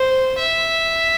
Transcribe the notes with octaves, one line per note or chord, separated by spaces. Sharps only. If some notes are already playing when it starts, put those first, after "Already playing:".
Already playing: C5
E5